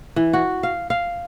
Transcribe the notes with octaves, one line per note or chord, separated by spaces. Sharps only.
E3
F#4
F5
F5